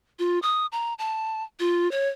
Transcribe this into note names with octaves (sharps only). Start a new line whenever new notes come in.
F4
D#6
A#5
A5
F4
C#5